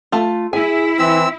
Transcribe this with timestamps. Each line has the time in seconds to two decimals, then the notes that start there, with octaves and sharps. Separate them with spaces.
0.12 A3 F4
0.53 E4 G#4 G#5
0.99 E3 C4 E6